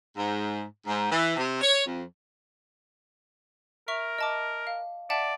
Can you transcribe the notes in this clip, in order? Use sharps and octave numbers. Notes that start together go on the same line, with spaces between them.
G#2
G#2
E3
C3
C#5
F2
A#4 E5 C#6 F7
D#5 A5 D6
F5
D5 E5 F#5 A5